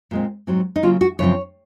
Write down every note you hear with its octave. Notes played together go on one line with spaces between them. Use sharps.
A#2 G#3 C4
G#2 F#3 C4
D#4
C#3 F#3 A#3 F4
F#4
F#2 C#3 F3 C4 C#5